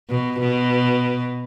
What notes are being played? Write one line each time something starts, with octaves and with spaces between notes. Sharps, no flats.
B2
B2